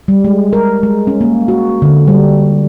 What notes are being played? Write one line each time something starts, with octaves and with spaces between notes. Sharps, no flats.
G3
G#3
A#4
G#3
C#4
A#3
F#4
D3
G3